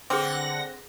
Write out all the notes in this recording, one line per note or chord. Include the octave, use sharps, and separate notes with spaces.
D3 C4 G#4 B4 F#5 D6 A#6